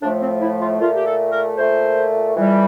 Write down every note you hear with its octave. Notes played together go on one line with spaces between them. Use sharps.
A2 F3 A3 D4
C4
E4
F4
A#2 A3 F4
G4
A4
A#4
A#2 A3 C5
F2 E3 G3